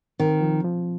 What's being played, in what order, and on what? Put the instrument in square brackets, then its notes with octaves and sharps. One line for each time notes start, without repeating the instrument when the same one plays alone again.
[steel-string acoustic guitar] D#3 [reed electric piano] C4
[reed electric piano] F3
F3